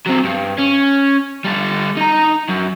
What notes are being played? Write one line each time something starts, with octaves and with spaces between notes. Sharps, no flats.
F#3 C4
G2
C#4
G3 A4
D#4 A#5
F#2